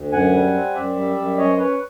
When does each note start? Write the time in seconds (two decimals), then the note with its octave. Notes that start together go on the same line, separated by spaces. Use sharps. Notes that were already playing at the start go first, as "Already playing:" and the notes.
Already playing: D2
0.12 F#2 F#5 G#5
0.33 G3
0.54 C4
0.74 F#2 D5 E5
0.96 G3
1.16 F#2
1.37 C#4 C#5 D#5
1.47 C5
1.58 C#4 B4 C#5